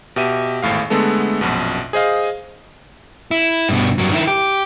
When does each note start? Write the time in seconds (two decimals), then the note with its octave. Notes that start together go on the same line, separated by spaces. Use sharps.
0.16 B2 G4 E5 D#7
0.62 G#1 E2 A2 F5
0.90 D3 G#3 A3 B3 A4
1.41 A#1 F#2 B2
1.93 G#4 C5 D#5 F5
3.31 E4
3.69 G2 B2
3.98 G2 F#3
4.12 D#3 E4
4.28 G4